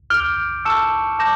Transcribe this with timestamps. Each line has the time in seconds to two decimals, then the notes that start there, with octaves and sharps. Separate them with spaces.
0.10 D6 F6 G6 D7 G7
0.65 A5 C#6 E6 F6 C#7 E7
1.19 A5 D6 G6 A#6 E7